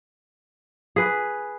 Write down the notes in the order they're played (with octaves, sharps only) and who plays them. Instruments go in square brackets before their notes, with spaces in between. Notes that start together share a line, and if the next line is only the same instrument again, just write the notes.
[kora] G#4 B4